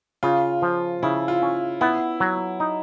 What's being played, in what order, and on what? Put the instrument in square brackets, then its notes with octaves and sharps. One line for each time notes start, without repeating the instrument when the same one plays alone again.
[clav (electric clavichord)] C#3 [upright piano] F4
[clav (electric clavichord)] F3
[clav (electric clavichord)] C#3 [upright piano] E4
[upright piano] F4
[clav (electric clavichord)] C#4
[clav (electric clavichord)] B3 [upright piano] E4
[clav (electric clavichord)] F#3
D#4